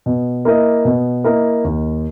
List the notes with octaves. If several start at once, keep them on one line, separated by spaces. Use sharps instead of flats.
B2
A#3 E4 A#4 D#5
B2
A#3 E4 A#4 D#5
D#2